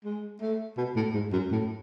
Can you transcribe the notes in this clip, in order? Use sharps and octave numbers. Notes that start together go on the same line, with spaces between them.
G#3
A3
B2
A2
G#2
F#2
A2